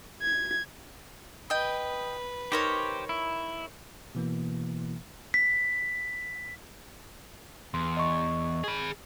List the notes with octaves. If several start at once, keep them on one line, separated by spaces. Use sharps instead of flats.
G#6
B4 D#5 G5
D#4 G4 A#4 C5 C#5
E4
B2 E3 A#3
B6
E2 C6
D#5 C#6
G#4 B5